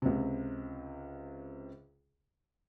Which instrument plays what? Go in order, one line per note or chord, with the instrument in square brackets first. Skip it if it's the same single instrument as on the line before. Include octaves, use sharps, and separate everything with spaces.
[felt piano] C#2 C3